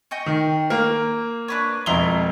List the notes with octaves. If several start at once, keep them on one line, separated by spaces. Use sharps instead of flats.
D#5 G5 C#6
D#3
A#3 F6
D4 B4 C#5
E1 F2 E4 A#5 C6 G7